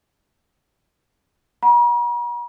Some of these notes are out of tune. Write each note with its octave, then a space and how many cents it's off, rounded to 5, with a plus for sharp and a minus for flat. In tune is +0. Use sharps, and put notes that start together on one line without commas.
F#5 +5 A#5 +45